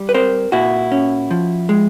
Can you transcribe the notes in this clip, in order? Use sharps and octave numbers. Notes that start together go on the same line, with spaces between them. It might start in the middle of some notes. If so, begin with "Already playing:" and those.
Already playing: G3
B4
C4 A#4 C5
A#2 E4 F#4
C#4
F3
G#3